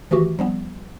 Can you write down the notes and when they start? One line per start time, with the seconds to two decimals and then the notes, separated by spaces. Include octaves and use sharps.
0.11 D#3 E3 A3 F#4 G4
0.39 F3 G3 B3